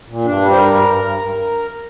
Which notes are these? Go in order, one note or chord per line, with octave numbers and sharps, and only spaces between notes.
A#2
G2 D4
G3
C5
G2 A#4
G2
G2
G2
G2